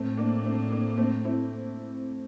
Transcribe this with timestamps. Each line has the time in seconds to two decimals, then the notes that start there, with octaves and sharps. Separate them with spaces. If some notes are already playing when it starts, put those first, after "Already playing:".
Already playing: A2 A3 C4
0.17 A#3 D4
0.45 A3 C4
0.71 A#3 D4
0.93 A#3
0.98 A3 C4
1.25 C4 E4